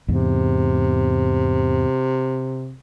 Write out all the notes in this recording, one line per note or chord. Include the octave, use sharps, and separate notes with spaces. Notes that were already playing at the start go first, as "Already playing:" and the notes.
E2 G#2 C3